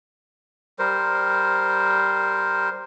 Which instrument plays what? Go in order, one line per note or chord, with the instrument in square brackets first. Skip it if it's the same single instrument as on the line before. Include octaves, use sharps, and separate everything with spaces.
[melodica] G3 A#4 C5